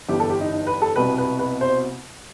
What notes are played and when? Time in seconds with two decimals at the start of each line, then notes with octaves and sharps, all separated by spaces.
0.09 G1 G2 E3 G3 G4
0.20 A4
0.30 G4
0.41 D#4
0.52 D#4
0.67 B4
0.82 A4
0.96 C2 B2 G3 B4
1.18 B4
1.39 B4
1.61 C5